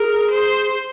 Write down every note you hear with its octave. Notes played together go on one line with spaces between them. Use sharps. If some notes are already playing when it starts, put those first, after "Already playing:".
Already playing: G#4 A#4
C5